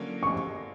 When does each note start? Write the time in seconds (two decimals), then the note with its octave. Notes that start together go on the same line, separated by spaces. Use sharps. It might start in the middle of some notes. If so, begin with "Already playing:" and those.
Already playing: D3 F#3 A#3 C#4
0.23 C#6